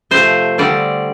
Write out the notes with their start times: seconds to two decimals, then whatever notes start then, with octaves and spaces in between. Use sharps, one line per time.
0.11 C3 F3 A3 C5
0.58 D3 G3 C4 D5